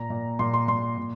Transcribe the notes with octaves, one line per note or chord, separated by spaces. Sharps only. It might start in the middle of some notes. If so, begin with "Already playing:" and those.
Already playing: A#2 A#5
A#2
A#2 C6
C6
A#2 C6
A#2